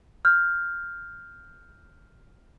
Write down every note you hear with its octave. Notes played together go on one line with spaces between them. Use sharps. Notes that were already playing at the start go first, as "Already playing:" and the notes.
F6 G6